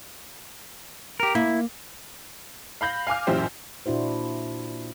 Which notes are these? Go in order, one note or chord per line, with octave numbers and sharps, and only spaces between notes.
G4 A#4
A#3 E4
F5 B5 G6 A#6
F5 G#5 D6 F6
A1 F#2 A#2 E4 G4 C5
A#2 D4 E4 F#4 C5